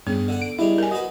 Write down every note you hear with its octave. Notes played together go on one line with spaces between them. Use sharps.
G2 C#3 B3
D3 F#5
D7
G2 G#3 E4 A#5
A#4 G#5
F#3 B4 D#5